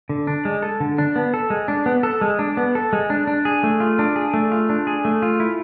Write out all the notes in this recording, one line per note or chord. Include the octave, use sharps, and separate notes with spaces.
D3
D4
G#3
A4
D3
D4
B3
A4
G#3
D4
B3
A4
G#3
D4
B3
A4
G#3
D4
D4
G#4
A3
F4
D4
G#4
A3
F4
D4
G#4
A3
F4
E4